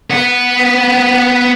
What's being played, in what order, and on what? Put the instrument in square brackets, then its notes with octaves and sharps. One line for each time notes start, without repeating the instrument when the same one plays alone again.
[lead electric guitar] B3 F#5